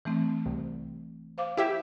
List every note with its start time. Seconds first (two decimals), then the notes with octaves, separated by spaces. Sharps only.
0.05 E3 A3 C4
0.46 C2
1.38 C5 F5 D6
1.57 E4 G4 E5